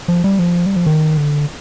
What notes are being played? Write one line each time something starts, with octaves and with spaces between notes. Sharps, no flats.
F3
G3
F3
G3
F3
D#3
D3